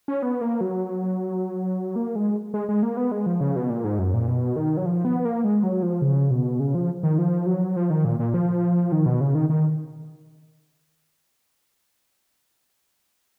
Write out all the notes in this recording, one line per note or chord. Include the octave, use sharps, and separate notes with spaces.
C#4
B3
A#3
F#3
A#3
G#3
G#3
G#3
A#3
B3
G#3
F3
C#3
B2
A#2
G#2
F#2
A#2
B2
D#3
F#3
F3
B3
A#3
G#3
F#3
F3
C#3
B2
C#3
F3
D#3
F3
F#3
F3
D#3
A#2
A#2
F3
D#3
B2
C#3
D#3
D#3